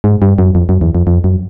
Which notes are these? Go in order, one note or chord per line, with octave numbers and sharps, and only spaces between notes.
G#2
G2
F#2
F2
F#2
E2
F2
F2
F#2